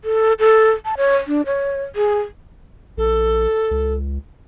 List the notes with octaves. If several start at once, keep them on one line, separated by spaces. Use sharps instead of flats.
A4
A4
A5
C#5
D4
C#5
G#4
A#1 A4
C#2